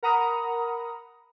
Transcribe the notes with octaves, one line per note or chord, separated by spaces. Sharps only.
A#4 F#5 A#5 B5 D#6